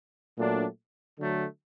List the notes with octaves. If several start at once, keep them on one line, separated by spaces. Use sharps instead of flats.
A#2 F#3 A3 D4
D3 F#3 A3